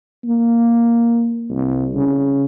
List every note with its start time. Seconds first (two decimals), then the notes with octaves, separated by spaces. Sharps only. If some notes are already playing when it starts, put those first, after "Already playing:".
0.25 A#3
1.50 C2
1.94 C#3